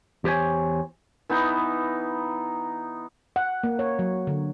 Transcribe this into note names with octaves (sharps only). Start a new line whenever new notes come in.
E2 G4 C5 C#5 G#5
E3 B3 D#4
F#5
A#3
C#5
F#3
D3